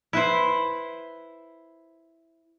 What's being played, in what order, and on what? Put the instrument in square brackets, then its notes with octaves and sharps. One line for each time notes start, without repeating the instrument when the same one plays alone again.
[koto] E4 B4 C5